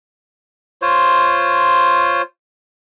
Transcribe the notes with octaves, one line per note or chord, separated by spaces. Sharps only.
F4 C5 C#5